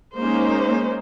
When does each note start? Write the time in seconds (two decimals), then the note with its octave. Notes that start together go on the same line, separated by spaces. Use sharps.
0.18 G#3 A#3 C#4 D#4 C5